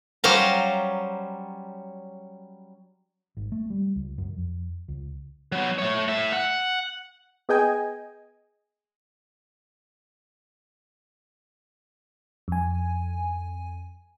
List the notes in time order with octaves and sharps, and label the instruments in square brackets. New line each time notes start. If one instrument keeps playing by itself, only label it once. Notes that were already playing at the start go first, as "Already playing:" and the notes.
[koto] F#3 G3 C#4 C5 F5 A#5
[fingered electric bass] G#1
A3
G3
C#2
F#2
F2
C#2
[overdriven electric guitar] F#3 B3
A3 C#5
A2 E5
F#5
[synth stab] B3 G#4 D#5 G5 G#5
[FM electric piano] F2 G#5